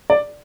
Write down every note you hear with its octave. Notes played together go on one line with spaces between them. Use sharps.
D5